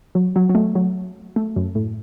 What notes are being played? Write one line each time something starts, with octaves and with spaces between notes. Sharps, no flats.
F#3
F#3
F#3
A3
F#3
A3
F#2
A2